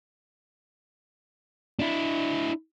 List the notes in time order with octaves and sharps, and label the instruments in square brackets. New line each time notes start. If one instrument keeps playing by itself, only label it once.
[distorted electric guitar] D4 E4